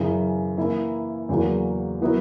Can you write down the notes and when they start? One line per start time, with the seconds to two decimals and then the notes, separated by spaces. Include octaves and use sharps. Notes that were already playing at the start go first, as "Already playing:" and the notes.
Already playing: F#2 C#3 E3
0.57 E3 A#3 E4
1.29 E2 C#3 F#3 A#3
2.01 F#3 B3 E4 A#4